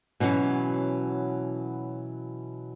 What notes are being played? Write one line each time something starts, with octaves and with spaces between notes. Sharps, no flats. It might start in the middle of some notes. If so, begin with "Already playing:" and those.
B2 E3 F#3 C#4